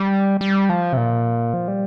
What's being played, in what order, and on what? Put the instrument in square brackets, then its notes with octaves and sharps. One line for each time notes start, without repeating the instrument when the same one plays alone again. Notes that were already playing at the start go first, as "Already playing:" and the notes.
Already playing: [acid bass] G3
G3
F3
C3
A#2
F3
G3